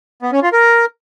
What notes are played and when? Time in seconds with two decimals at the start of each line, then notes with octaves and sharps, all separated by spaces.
0.22 B3
0.33 C#4
0.43 F4
0.53 A#4